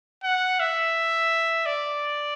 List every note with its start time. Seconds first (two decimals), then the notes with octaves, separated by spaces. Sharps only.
0.24 F#5
0.60 E5
1.66 D5